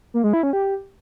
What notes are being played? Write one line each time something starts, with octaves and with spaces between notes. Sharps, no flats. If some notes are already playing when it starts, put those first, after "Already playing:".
A#3
G#3
E4
C#4
G4